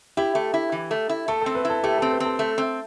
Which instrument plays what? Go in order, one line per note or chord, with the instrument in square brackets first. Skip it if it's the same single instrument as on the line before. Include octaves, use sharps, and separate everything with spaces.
[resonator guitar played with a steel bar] E4 [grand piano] G4
[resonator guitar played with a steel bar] A3
E4
E3
A3
E4
[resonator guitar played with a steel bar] A3 [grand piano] A4
[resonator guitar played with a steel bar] C4 [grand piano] A4
[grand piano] B4
[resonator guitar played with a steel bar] E4 [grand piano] A4
[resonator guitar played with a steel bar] A3 [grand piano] G4
[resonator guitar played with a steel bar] C4 [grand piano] A4
[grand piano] B4
[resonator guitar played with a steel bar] C4
[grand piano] A4
[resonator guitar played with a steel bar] A3
C4